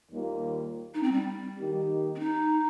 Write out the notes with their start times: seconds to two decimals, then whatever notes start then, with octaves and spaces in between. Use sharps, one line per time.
0.10 D#2 D#3 G3 A#3 F4
0.94 D#4
1.03 C4
1.11 G3
1.58 D#3 A#3 D#4 G4
2.15 C4
2.19 D#4